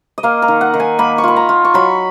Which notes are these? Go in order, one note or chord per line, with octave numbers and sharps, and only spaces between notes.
D#5
A#3 F5
A#5
D#3
F#5
D#3
G#5
A#3 B5
C#6
F4 B5
A#5
F4
C#6
F#3 B5